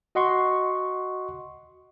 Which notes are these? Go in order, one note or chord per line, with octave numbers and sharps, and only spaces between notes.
F#4 D#5 F#5 C6 C#6